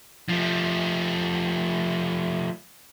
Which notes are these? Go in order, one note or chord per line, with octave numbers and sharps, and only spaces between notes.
F3 A3